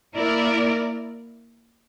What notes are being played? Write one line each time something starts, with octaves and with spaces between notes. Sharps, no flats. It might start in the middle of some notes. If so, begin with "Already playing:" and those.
A#3 E4 A#4 D5